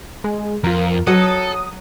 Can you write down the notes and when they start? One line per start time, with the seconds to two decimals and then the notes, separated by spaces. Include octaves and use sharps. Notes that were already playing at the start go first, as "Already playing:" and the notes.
0.24 G#3
0.64 F2 F4 A#4
1.07 F#3 A4 D#5 F#5 D#6